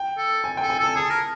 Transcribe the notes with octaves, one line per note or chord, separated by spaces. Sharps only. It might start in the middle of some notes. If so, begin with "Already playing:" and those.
Already playing: G5
A4
G#5
G5
A4
G#5
A4 A5
G#4 A5
A#4